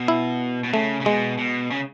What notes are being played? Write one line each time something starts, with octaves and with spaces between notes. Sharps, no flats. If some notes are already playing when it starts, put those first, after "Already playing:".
Already playing: B2
E4
B2
C#3 A3
C#3
B2 G#3
B2
C#3